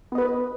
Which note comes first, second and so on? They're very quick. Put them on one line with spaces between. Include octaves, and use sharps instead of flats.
B3 D#5 B4